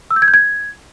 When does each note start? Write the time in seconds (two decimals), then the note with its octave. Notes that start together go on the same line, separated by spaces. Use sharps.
0.11 E6
0.16 G6
0.22 G#6
0.28 G6
0.34 G#6